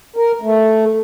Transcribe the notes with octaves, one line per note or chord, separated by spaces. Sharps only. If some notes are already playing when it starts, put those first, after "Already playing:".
A#4
A3